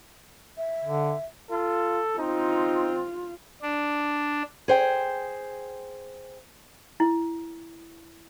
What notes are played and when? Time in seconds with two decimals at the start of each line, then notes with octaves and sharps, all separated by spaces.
0.57 E5
0.84 D3
1.51 F4 A4
2.19 C4 D#4 F4
3.62 D4
4.68 G#4 C5 G5
7.00 E4